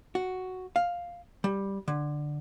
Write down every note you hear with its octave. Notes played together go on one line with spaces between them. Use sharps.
F#4
F5
G3
D3